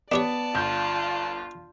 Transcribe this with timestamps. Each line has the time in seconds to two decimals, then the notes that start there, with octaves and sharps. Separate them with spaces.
0.12 B3 D4 G4 C#5 D5 A5
0.55 G1 F4 G6